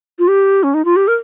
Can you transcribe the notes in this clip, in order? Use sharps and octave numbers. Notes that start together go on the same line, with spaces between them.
F4
G4
C#4
D#4
F4
G4
A#4